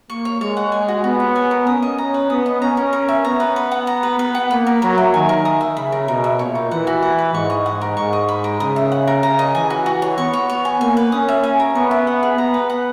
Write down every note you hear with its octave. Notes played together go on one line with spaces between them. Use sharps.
A#3 C#6
C#5
G#3 C#5
F#5
G#5
F#4
B3 F#4
C#5
G#5
A#4
C#4 D#6
D#5
A#5
B4
B3 D#6
D#5
C#4 A#5
A#4
A#4
E5
B3 A#5
B4
B4
F#5
A#5
B4
B3 B4
F#5
A#3 B5
A#4
F#3 A#4
E5
D#3 G#5
A#4
D#6
E5
C#3 B5
A#4
B2 A#4
E5
A#2 C#5
D#4
E3 F#5
F#4
F#5
B4
G#2 C#6
D#5
F#5
A#4
G#2 C#6
D#5
B5
A#4
C#3 D#6
E5
F#5
A#4
C#3 A#5
D#5
E3 G#5
F#4
F#4
C#5
B3 C#6
C#5
C#5
G#5
A#3 G#5
B4
C#4 D#6
E5
G#5
A#4
B3 C#6
E5
F#5
G#4
B3 A#5
B4
F#5